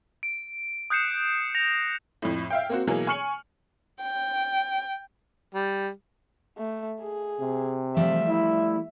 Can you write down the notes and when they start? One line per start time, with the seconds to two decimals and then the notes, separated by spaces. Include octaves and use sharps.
0.23 D7
0.90 D#6 F#6 G6 C7 C#7 E7
1.55 A#6 F7
2.22 F2 A2
2.50 E5 F5 G5
2.69 A#3 C4 F#4
2.87 B2 E3 F#3 A#3 G#4
3.07 G#5 C#6 F6 C#7 F#7
4.02 G5
5.55 G3
6.58 A3
7.01 G#4
7.40 C3
7.97 F3 G3 A3 E5
8.28 E4